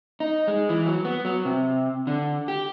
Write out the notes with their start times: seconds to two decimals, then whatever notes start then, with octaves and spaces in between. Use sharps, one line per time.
0.20 D#4
0.48 G#3
0.69 E3
0.86 F#3
1.05 B3
1.25 F#3
1.45 C3
2.07 D3
2.48 G4